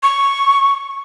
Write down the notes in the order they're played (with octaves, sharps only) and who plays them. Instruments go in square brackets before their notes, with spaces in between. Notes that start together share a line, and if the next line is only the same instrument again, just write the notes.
[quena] C#6